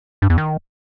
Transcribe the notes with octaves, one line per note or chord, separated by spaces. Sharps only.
G2
E2
D#3